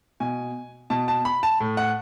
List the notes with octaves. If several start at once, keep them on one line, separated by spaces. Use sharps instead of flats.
B2 G#5
B2 A5
A5
B5
A5
A2
F#5